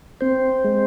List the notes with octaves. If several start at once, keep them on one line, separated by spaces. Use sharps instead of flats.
C4 C5
G#3